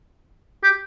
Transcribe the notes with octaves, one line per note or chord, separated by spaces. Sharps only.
G4